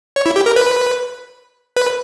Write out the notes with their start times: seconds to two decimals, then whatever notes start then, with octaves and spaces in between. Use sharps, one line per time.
0.16 C#5
0.26 E4
0.36 G4
0.46 A#4
0.56 B4
1.76 B4